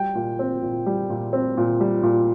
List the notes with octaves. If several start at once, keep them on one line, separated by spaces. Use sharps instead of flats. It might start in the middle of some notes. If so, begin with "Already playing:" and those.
Already playing: G3 G5
A#2
C4
A#2
G3
A#2
C4
A#2
G3
A#2